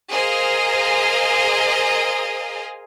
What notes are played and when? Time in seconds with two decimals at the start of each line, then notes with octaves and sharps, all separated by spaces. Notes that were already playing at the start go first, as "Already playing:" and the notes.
0.11 G#4 A#4 C5 D#5 F5 G#5